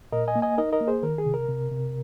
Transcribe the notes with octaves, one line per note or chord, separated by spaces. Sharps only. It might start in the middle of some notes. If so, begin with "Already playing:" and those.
A#2 A#4 D#5
D#5 G#5
A#3
D#5 G#5
D#4 A#4 D#5
A#4 D#5
A#3
G#4 C5
D#3 A#4
G#4
C3
A#4
C3
C3